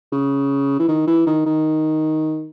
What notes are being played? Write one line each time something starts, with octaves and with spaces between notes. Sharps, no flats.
C#3
E3
D#3
E3
D#3
D#3